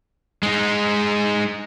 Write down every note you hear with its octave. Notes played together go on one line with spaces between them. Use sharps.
G#3 D#4